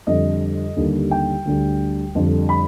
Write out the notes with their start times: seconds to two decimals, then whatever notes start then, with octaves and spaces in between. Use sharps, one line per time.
0.07 F2 D3 G3 D#5
0.77 D#2 D3 G3
1.11 G5
1.45 D2 D3 G3
2.15 F2 D3 G3
2.49 B5